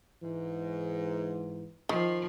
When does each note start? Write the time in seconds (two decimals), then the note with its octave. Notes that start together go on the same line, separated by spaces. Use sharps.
0.22 G#2 E3
1.89 D#3 F3